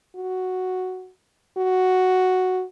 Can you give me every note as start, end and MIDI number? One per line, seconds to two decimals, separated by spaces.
0.16 1.11 66
1.58 2.64 66